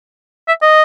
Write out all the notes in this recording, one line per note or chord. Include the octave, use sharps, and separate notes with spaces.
E5
D#5